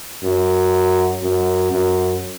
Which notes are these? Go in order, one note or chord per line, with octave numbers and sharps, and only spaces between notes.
F#2
F#2
F#2